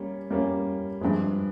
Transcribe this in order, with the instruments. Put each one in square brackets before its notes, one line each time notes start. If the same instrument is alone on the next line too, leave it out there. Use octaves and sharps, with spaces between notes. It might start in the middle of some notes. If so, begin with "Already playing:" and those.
Already playing: [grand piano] G3 A#3 C#4
G3 A#3 C#4
G2 F3 G#3